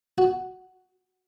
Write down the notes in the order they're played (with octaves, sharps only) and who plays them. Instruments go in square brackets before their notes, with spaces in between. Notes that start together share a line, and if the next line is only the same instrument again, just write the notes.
[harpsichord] F#4